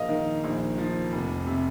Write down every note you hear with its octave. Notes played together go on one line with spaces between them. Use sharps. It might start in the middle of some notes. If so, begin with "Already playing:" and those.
Already playing: A#1 A#3 D#5 F5
D#3
A#1
F3
F1
C3